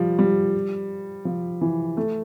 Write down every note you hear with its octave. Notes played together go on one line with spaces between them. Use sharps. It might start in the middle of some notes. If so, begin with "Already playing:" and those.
Already playing: F3 G3
G3
F3
E3
A3